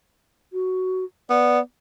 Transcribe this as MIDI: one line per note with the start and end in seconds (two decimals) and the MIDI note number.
0.53 1.04 66
1.30 1.59 59
1.30 1.60 74